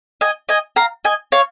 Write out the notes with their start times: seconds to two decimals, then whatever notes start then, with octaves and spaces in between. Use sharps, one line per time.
0.21 D#5 G#5
0.49 D#5 G#5
0.76 F5 A#5
1.05 D#5 G#5
1.32 C#5 F5